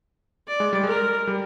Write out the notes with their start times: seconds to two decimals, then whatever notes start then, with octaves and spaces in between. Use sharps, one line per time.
0.48 D5
0.60 G#3
0.73 G3
0.83 G#3 A#4
1.27 G3